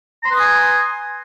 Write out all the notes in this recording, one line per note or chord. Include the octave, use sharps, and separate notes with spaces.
B4 G#5 A#5 C6 D#6